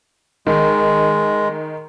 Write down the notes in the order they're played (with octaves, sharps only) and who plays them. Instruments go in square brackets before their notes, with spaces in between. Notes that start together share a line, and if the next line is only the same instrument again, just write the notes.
[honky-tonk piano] D#3 [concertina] G#3